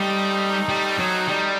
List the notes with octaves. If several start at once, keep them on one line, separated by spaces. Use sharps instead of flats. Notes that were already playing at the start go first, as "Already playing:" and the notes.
Already playing: G3 A3 C4 D#4
G3
F#3
G3